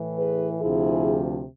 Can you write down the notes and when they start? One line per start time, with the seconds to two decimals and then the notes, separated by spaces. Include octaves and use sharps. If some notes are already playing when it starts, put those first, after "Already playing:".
Already playing: A2 E3
0.19 G#4 B4
0.60 D2 C3 F3 E4 G#4